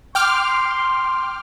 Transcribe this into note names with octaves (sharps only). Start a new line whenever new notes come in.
G5 C6 D6 F6